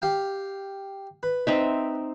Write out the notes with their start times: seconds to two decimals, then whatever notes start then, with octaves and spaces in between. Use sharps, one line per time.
0.02 G4 F5 G5
1.23 B4
1.47 C4 D#4 E5